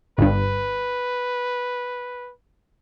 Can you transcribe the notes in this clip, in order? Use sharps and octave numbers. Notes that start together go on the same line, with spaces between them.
G1 G2 B4